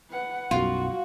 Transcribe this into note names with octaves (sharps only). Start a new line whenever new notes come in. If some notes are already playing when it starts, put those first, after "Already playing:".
B4 F#5
B1 F#2 F4 F#4